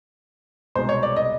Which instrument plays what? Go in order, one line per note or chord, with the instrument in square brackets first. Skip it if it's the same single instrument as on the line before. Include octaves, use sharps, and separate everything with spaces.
[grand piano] C2 B2 G#3 B3 C5
C#5
D5
D#5